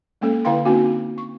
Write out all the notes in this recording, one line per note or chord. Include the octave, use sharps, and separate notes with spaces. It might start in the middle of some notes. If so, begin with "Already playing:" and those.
G#3 A#3 C#4 A4
D3 E4 B4 F5 G5 C6
A#3 C4 C#4 D#4 F#4
C#6